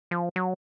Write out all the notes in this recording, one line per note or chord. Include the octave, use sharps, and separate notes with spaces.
F3
F#3